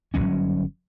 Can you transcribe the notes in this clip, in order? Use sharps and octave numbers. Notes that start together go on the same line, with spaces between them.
G1 G2 F#3 C#4